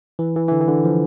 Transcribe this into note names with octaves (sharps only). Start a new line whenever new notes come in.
E3
E3
E3
D3
E3
D3
F3